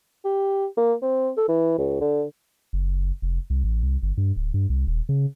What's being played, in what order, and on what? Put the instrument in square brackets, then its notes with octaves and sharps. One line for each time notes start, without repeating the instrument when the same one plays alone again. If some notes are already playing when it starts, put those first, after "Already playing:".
[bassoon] G4
A#3
C4
A4
E3
C#2
D3
[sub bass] F#1
F1
C2
A1
C2
G1
G2
D1
G2
C2
D#1
C#3